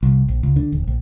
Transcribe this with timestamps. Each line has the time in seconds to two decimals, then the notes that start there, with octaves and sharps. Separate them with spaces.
0.03 C2
0.28 A#1
0.43 C#2
0.56 D3
0.72 D#1
0.87 A#1